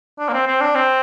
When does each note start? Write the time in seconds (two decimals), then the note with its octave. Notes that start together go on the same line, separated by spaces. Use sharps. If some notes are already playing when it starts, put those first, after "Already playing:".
0.19 D4
0.29 A#3
0.33 C4
0.48 C4
0.61 D4
0.76 C4